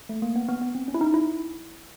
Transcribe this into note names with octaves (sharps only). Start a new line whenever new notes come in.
A3
A#3
B3
B3
B3
C4
C#4
E4
D#4
E4